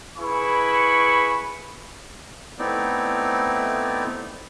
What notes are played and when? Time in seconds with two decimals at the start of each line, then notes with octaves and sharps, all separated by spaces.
0.18 E4 G#4 B4 G#5 C#6
2.59 A3 B3 C4 D#4 E4 D5